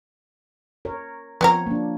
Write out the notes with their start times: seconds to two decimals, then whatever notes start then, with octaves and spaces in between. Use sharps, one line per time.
0.85 A#4 C#5
1.41 F3 B3 C4 A#4 C#5
1.66 A#3 D4